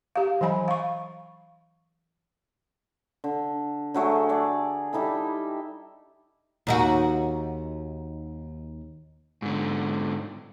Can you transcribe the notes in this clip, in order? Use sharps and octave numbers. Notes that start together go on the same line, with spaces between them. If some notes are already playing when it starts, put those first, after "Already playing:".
G4 F5
E3 F#3 G#5 B5
F5 C#6
D3
D3 F#3 A3 G#4
G#4 D5
G3 D#4 E4 A4
D#2 D#4 F#4
G#2 D3